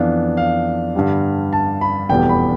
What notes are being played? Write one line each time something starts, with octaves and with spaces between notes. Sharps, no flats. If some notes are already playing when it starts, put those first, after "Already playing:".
Already playing: F2 E3 B3 D4 F5
F5
G2 D3 G3
A5
B5
F1 E2 B2 G3 B3 G5
B5